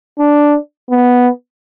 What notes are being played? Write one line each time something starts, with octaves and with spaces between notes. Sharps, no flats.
D4
B3